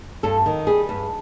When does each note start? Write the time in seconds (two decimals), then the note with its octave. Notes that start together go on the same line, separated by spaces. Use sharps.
0.23 G2 A4
0.46 D#3
0.67 G3 G#4
0.89 G2